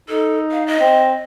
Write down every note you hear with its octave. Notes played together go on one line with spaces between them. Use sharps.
D#4 A4
F5
D#5
C4